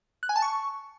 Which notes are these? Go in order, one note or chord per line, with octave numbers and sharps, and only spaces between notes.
F#6
G#5
A5
C#6